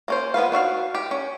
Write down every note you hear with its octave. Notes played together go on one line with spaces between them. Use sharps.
A#3 C#4 C5
F3 B3 B4 F5
D4 F#4 E5 F5
G4
C#4